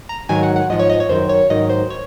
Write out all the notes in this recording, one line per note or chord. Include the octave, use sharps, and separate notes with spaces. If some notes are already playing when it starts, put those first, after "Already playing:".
A#5
G#2 D#3 F#3 G#5
F#5
F#5
G#2 F3 D#5
C#5
D#5
C#5
F#2 D#3 F#3 C5
C#5
G#2 D#3 F#3 D#5
C5
C#5